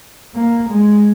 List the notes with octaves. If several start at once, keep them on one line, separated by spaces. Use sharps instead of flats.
A#3
G#3